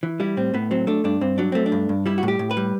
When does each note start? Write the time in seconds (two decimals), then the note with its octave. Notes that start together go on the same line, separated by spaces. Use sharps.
0.03 E3
0.20 G3 E4
0.37 A2 C4
0.54 A2 B3
0.71 F#3 C4
0.87 A3 D4
1.04 G2 D4
1.21 G2 C4
1.38 F#3 D4
1.52 A3 C4
1.66 D4
1.72 G2
1.89 G2
2.06 G3 E4
2.18 F#4
2.23 A2
2.28 G4
2.39 A2
2.51 B4
2.57 G3